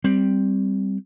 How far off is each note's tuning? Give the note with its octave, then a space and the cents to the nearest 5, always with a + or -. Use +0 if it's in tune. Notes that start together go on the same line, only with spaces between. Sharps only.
G3 +0 C4 +0